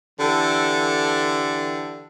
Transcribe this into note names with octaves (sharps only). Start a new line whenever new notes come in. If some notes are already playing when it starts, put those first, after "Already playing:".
D3 E3 G4 A4